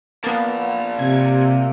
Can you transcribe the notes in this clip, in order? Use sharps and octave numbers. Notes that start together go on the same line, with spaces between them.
A#2 A#3 B3 A5
C3 G#6